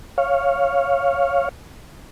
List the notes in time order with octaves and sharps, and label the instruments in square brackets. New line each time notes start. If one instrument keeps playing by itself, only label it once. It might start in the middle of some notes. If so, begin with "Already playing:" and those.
[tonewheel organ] C#5 F5